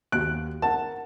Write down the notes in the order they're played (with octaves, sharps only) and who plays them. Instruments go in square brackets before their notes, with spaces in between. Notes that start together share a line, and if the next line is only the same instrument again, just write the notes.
[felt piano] D#2 F#4 D7 [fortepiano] F#6
[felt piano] A#4 F#5 [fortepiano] A5